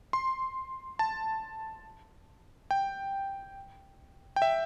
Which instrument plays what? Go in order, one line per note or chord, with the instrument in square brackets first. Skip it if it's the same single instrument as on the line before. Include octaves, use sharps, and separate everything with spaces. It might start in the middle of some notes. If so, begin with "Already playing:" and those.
[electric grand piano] C6
A5
G5
G5
E5